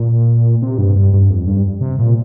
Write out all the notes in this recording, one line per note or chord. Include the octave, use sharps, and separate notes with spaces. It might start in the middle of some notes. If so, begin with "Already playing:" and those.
Already playing: A#2
C3
G2
G2
G2
F2
G2
C3
A#2